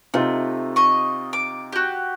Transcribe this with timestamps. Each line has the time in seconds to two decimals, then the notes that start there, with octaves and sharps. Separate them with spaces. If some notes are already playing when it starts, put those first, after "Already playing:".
0.14 C3 A3 D#4 F4
0.76 D#5 C#6
1.33 D6
1.73 F#4 G4